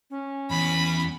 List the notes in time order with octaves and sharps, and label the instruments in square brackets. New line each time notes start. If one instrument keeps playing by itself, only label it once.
[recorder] C#4
[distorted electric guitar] E2 [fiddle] B5